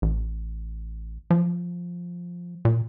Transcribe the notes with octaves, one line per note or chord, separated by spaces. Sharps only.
A1
F3
A#2